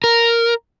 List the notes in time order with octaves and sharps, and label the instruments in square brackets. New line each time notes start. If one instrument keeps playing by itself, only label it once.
[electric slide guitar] A#4